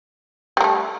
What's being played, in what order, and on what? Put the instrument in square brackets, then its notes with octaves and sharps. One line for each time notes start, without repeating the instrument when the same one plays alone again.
[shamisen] G3
A#3
A3